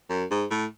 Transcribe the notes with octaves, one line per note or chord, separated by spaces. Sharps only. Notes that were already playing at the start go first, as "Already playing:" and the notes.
F#2
G#2
A2